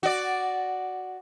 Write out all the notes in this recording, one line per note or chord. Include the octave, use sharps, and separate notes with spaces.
F#4 D5